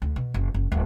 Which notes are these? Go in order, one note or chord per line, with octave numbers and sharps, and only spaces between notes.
D2
B2
F#1
F#1
D1